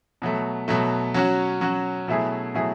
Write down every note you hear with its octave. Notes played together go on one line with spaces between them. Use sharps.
B2 F#3 A3
B2 F#3 A3
F#3 C#4 F#4
F#3 C#4 F#4
B2 F#3 A3 E4 G#4
B2 F#3 A3 E4 G#4